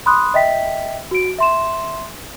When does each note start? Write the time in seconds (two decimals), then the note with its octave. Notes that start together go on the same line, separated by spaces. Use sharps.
0.06 B5 C6 D#6 F#6
0.34 D#5 E5 G5 B6
1.11 F#4 D7
1.38 E5 C6 E7